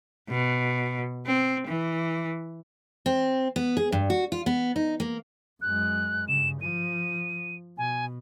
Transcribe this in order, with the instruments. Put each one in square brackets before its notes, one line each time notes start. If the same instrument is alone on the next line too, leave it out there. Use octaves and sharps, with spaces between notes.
[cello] B2
C4
E3
[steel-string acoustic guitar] C4
B3
G#4
G2
F#4
F4
B3
D#4
A#3
[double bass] F#2 G#3 [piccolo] F#6
[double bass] G2 C#3 [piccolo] E7
[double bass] F3 [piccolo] D#7
[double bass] B2 [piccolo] G#5